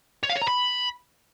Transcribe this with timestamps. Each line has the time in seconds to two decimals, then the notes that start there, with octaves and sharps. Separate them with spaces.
0.23 C#5
0.29 F5
0.36 C#5
0.42 A#5
0.48 B5